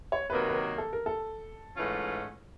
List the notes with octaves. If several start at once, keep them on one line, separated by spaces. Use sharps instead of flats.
C#5
C3 D#3 F#3 A#3 B4
B4
A#4
A4
A#4
A4
G#2 E3 A3 C#4 F4